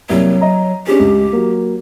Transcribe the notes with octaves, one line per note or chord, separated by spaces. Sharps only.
C2 F#3 G3 A#3
D#5 A#5
C#4 D4 G4 G#4
C#2
F#3 A#3